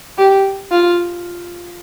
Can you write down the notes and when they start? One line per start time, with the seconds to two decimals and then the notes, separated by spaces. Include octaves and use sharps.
0.18 G4
0.71 F4